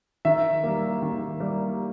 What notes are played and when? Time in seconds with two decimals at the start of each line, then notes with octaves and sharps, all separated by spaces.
0.25 D#3 E5
0.64 G3 A#3
1.02 D#3
1.40 G3 A#3